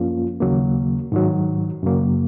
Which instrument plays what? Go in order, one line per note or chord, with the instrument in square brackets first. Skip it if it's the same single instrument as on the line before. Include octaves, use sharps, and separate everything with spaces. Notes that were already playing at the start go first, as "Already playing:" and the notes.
Already playing: [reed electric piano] F#2 F3 A#3 C#4 F4
D#2 C#3 F#3 A#3
G#2 D#3 F#3
F#2 C#3 F#3 A#3